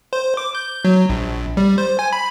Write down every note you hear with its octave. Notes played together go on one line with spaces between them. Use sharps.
C5
D6
G6
F#3
A#1
G3
C5
G#5
B5